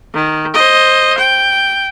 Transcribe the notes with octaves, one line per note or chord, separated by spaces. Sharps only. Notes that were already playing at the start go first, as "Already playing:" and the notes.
D#3
C5 D#5
G5